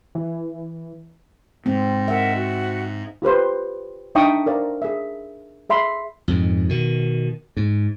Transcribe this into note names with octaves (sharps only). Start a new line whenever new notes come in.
E3
G#2 C4
A#4 D#5 E5 F#5
F#4
F4 G4 B4 C5
D4 D#4 E5 G5 C#6 D#6
A#4 C5 D5 F5
G#4 E5
G#4 E5 B5 C6
F2 G#2
B2 D#3
G#2